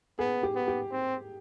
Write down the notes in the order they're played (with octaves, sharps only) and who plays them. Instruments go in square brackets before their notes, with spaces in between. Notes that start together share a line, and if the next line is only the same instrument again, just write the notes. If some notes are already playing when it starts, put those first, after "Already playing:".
[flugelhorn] B3 [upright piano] G#4
[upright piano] G4
[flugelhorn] B3
[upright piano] G4
[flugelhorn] C4